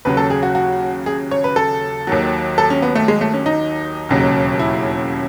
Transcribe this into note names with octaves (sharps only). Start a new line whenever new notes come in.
D#2 C#3 F#3 B4
A4
G#4
F#4
F#4
G#4
C#5
B4
A4
D#2 D#3 F#3
A4
C#4
B3
A3
G#3
A3
C#4
D#4
E1 D#2 C#3 F#3
E4